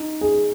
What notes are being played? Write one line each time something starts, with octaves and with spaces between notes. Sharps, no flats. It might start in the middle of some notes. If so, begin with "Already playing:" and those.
Already playing: D#4
G#4